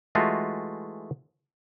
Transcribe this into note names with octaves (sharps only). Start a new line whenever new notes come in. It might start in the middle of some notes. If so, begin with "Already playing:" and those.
E3 G#3 A3 F4 F#4